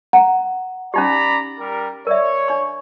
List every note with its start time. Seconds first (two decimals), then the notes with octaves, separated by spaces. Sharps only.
0.13 F#5 A#5
0.94 C#4 D#4 G4 D5 A#5 B5
1.59 G3 A#4
2.07 A#4 C#5 D5 E5
2.48 D4 C#6